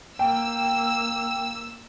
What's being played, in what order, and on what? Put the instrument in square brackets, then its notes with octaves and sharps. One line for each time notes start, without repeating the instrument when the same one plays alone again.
[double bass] A#3 [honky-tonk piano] G5 [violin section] E6